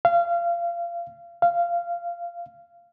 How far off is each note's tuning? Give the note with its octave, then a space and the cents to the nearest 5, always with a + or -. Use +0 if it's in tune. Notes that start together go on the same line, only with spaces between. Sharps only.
F5 -25
F5 -15